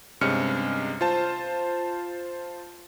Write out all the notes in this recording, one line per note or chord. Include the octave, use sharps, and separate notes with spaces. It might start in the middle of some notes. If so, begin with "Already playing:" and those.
G2 C3 G#3 C#4 F6 C#7
F4 C5 A5